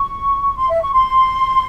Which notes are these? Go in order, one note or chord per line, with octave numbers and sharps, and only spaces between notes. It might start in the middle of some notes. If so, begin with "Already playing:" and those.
Already playing: C#6
C6
E5
C#6
C6